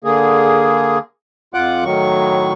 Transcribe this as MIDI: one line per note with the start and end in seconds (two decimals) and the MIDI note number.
0.04 0.98 50
0.04 0.98 58
0.04 0.98 68
1.54 1.84 41
1.54 1.84 65
1.54 1.84 78
1.54 1.84 86
1.54 1.84 90
1.84 2.53 45
1.84 2.53 51
1.84 2.53 54
1.84 2.53 85